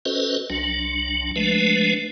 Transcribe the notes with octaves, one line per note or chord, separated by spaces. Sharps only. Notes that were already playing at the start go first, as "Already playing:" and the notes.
C#4 F#4 A4 B4 C5 D#5
C2 F#3 D4
F3 G#3 A3 D4 B4